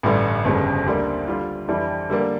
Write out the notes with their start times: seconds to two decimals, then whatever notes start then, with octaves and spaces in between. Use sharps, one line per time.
0.03 A1 G2 D3 G3
0.45 G1 F2 C#3 G3
0.86 D2 D3 G3 A#3 D4
1.27 D3 G3 D4 F4
1.68 F2 E3 G3 D4
2.10 D3 G3 A#3 D4